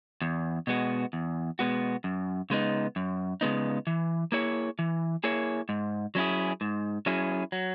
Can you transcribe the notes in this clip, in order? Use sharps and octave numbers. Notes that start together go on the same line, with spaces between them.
E2
B2 G#3 B3 F#4
E2
B2 G#3 B3 F#4
F#2
C#3 G#3 B3 D#4
F#2
C#3 G#3 B3 D#4
E3
A#3 E4 G#4 C#5
E3
A#3 E4 G#4 C#5
G#2
F#3 C#4 E4 G#4
G#2
F#3 C#4 E4 G#4
F#3